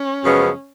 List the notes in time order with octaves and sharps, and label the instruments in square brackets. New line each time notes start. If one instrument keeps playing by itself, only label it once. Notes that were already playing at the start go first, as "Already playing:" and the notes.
Already playing: [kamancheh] C#4
[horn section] F#2 C#3 F3 G#3 B3